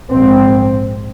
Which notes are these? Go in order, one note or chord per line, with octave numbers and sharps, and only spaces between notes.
A#1 G#2 C4